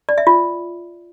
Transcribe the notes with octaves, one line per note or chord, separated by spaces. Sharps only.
D5
E5
F4